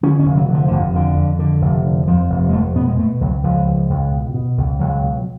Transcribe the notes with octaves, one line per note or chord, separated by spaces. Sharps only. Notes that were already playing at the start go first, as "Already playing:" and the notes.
D3 C#4
C#4
F1
F#3
D3
F3
F1 D3
F2 D3
F2
D3
F1
D3
F2 F3
F1
G#3
F1 A3
B2 B3
G#3
B2 A3
C#2 F#3
C#2 F3
C#2
C#2
B2
B2
C#2
C#2 F#3
B2